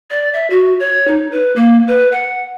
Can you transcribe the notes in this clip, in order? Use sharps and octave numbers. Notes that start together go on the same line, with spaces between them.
D5
E5
F#4
C#5
D#4
B4
A#3
B4
F#5